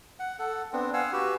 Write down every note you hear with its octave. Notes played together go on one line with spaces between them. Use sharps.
F#5
A4 F#5
B3 C4 D4
F5 F#5 G#5 E6
F#4 G4 B4 E6